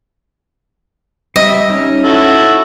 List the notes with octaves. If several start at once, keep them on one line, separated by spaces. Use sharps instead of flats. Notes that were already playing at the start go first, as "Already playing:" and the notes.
G3 D#5 E5
C#4 D#4
E4 F#4 A4